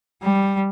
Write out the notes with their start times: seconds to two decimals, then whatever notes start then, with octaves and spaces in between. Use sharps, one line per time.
0.22 G3